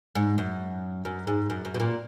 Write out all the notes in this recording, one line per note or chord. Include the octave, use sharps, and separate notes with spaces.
G#2
F#2
F#2
G#2
F#2
F#2
B2
A#2